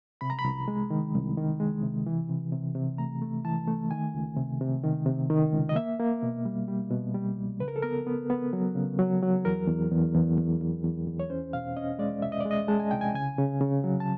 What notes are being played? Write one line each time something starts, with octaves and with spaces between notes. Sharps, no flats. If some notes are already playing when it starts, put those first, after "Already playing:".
C3 B5
A#5
B5
C2
G#3
D#3
C2
D#3
G#3
C3
E3
C3
C3
C3
A3 A#5
A3
E3 A5
A3
D#3 G#5
C#2
C3
C3
D#3
C3
D#3
C#2
D#5
A#3 E5
A#3
B2
G3
G3
B2
G3
C2
C#3 B4
A#4
A4
B3 A#4
B3
B3
F#3
C#3
F#3
F#3
E2 A#4
E2
E2
E2
E2
E2
E2
E2
C#5
C#4 C5
B2 F5
C#4 D#5
G#3 D5
C2 E5
D#5
D5
G#3
D#5
G#3 A5
G#5
C2 G5
G#5
C#3 G#5
C#3
C#3
F#3
A5